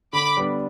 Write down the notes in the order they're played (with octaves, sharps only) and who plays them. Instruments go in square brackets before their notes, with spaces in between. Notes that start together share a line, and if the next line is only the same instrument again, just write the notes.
[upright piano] D3 [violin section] B5 D6
[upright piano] G3 B3 D4